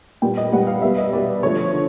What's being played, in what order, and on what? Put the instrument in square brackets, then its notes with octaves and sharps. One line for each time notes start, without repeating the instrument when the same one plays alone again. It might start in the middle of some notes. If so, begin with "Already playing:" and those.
[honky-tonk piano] A#2 G3 B3 G5
D#5
A#2 G3 B3 F#5
F5
B2 G3 B3 E5
D#5
B2 G3 B3 D5
D3 F3 A3 C#5
D3